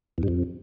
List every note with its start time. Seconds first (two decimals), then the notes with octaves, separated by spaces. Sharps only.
0.18 E2
0.23 G2
0.28 F2